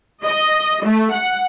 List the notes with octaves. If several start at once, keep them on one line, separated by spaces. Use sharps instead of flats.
D#5
A3
F#5